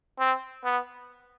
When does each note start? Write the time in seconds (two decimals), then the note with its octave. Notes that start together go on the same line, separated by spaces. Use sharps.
0.19 C4
0.64 B3